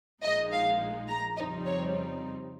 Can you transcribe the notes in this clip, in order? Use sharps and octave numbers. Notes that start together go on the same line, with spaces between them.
A#1 A#2 F3 G#3 D#4 D#5
F5
A#5
F2 C#3 G3 C4 D#4 D#5
C#5